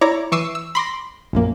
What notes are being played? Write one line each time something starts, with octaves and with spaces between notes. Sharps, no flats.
E4 C#5 D5 A#5 D6
E3 C#6 D6 E6 C7 D#7
E6
B5 C6 D6 A#6
A#1 F#2 A#3